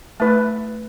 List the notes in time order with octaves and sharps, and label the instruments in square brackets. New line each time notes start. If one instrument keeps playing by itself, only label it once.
[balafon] A3 [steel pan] E4 B4 E5 A5